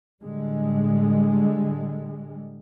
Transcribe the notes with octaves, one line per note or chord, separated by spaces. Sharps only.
A2 D3 G3 G#3